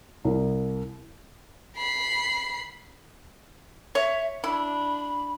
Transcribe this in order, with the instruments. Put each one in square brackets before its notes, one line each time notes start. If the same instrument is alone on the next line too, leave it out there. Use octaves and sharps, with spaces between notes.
[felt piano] C2
[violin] B5 C7
[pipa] C#5 [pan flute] E5
[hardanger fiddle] D4 [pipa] E4 [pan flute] B5